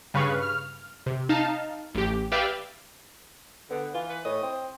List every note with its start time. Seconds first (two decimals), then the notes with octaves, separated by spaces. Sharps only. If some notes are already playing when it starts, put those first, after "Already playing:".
0.14 G2 C#3 B4 F5 C#6
0.42 F6
1.06 C3
1.29 D#4 F5 A5
1.95 A1 G4
2.32 G4 B4 D5 E5 F5 G5
3.70 D3 B3
3.94 E3 F4
4.09 B4
4.25 A2 D#5
4.43 C4